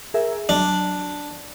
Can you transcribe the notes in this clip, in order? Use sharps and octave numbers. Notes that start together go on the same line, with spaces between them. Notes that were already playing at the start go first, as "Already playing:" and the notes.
G#4 A#4 E5
F#3 D4